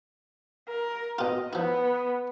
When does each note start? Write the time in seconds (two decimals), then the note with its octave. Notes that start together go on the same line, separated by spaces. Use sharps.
0.68 A#4
1.18 B2 F4 D#5
1.53 F3 B3 E4